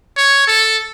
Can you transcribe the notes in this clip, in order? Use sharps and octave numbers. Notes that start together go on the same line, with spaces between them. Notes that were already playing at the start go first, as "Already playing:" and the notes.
C#5
A4